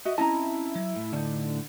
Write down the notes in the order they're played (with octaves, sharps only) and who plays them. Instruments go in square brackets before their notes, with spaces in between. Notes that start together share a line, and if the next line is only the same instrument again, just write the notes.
[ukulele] F#4 E5 [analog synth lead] D#5
[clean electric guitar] C4 C#4 A5 [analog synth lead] E4 [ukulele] D#5 A#5
[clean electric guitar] F#3
A2
[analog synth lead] D3 [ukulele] C#4 D#4